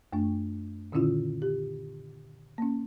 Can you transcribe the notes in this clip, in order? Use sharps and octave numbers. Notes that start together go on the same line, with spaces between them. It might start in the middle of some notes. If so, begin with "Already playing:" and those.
F#2 A3 D4
A#2 D3 D#3 C#4 E4 F4
G4
A#3 C#4